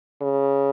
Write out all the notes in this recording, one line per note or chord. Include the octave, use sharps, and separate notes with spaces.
C#3